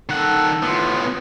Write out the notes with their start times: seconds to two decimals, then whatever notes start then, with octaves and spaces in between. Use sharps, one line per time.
0.09 D#3 A4 F#5
0.63 A2 B3 F4